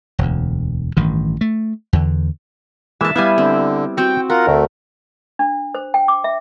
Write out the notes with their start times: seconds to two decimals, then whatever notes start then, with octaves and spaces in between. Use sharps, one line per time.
0.19 E1 D2
0.97 A1 G2 D#3
1.41 A3
1.93 E2 D3
3.01 E3 G#3 A#3 E5 A5
3.16 G3 B3 E4 E5 F5 G#5
3.38 D3 C4
3.97 C4 F#4 G5
4.30 F4 A#4 F#5
4.47 D2 A3
5.39 D4
5.75 C5
5.94 G5
6.08 D6
6.24 E5